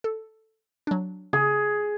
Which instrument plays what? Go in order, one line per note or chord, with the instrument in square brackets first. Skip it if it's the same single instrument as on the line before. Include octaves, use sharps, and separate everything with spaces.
[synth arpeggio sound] A4
F#3 D4
[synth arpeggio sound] C#3 [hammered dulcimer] G#4